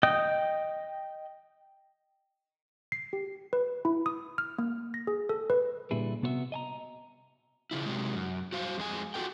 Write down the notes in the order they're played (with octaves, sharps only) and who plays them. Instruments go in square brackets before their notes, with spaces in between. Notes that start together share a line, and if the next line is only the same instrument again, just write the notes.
[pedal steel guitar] D#5 G5 D#6 G6
[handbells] C7
G4
B4
E4
D#6
F6
A#3
A#6
G#4
A4
B4
[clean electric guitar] A#2 D3 G3 E4 G#4
C3 B3 F#4 B4 E5
D#5 G#5 A#5
[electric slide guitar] C#3 F3 E4
C3 F#3 G#3
F#2
F#4 C5 F5
F2 G#3 G#5
F4 F#4 A4 A#4 G5